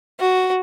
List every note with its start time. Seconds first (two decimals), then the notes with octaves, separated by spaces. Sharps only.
0.20 F#4